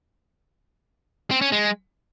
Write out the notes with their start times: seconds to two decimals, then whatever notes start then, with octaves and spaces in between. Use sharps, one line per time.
1.31 C4
1.41 C#4
1.52 G#3